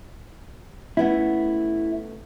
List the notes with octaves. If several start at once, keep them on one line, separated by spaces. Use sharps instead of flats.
A3 B3 C#4 E4